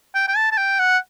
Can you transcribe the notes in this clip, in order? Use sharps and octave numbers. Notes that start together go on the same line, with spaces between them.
G5
G5
A5
A5
G5
F#5